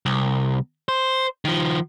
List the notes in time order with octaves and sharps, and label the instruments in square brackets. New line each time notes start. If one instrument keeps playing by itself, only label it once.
[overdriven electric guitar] C2
C5
D#3 F3